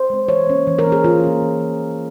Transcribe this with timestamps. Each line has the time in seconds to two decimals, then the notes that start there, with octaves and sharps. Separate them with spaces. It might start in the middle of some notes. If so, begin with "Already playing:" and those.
Already playing: C5
0.10 G#3 C4
0.28 E3 C#5
0.47 A#3 C#4
0.67 E3
0.79 A#4
0.85 A#3 C#4
0.92 G#4
1.04 E3 F4
1.24 A#3 C#4
1.42 E3